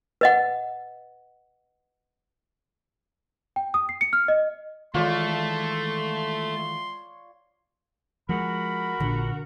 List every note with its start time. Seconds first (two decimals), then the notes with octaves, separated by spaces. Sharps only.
0.21 B4 D#5 F#5
3.56 G5
3.74 D#6
3.89 C7
4.01 C#7
4.13 F6
4.28 D#5
4.95 D#3 E3 G#3 A3 F4 C#5 D5 C6
8.29 F3 G#3 F#4 A#4 B5
9.00 A#1 D3